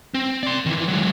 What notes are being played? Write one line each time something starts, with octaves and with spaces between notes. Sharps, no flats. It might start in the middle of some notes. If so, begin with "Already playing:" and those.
C4
D5 C6
D#3 E3
F#3 G#3